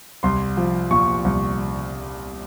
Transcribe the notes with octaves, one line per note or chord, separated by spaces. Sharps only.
C2 C6
F3
A#2 C#6
C2